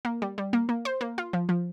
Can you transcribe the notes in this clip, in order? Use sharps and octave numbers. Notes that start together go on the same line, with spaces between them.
A#3
G3
G3
A#3
A#3
C5
A#3
F4
F3
F3